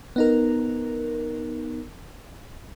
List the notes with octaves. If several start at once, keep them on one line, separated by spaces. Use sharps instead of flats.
B3 D#4 A#4